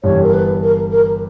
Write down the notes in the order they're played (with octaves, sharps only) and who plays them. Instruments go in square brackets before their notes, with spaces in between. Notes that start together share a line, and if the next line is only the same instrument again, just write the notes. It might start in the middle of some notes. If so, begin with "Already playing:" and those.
[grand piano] G1 G2 E3 G3 [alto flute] C#5
[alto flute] A#4
B4
A#4
A#4